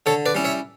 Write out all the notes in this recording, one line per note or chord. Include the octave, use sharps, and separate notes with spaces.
D3 A4 C#5
B4 D5
G3 C#4 E4
C#5 E5